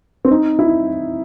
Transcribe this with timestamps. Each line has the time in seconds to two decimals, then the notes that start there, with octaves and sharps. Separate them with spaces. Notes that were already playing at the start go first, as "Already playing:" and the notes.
0.25 C4
0.31 D#4
0.59 E4